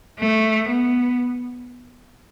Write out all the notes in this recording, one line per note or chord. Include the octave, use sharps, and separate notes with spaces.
A3
B3